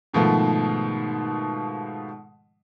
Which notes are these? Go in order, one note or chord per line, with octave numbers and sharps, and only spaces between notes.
G#2 B2 D#3 F3 A3